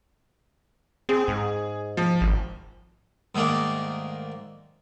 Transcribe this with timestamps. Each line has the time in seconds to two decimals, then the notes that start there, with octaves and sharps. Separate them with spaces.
1.09 C4 G#4
1.28 G#2
1.97 F3
2.21 G#1
3.35 G#2 D#3 A3 A#3 D4